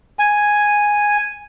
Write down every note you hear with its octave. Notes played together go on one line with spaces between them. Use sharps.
G#5